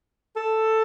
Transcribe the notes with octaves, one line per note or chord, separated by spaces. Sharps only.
A4